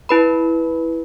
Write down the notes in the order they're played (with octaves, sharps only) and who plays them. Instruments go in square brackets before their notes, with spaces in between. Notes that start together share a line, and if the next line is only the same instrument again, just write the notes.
[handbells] E4 B4 B5